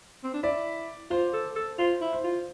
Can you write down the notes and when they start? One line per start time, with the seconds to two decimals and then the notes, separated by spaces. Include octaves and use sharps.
0.24 C4
0.34 D4
0.43 E4 D5
1.11 F4 C5
1.33 A4
1.56 A4
1.79 F4 C5
2.01 E4
2.13 C5
2.24 F4